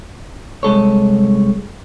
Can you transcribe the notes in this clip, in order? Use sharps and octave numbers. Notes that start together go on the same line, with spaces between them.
C2 G#3 A4 C#5